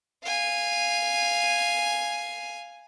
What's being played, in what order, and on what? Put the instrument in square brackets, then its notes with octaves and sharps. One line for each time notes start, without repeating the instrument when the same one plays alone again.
[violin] F5 G#5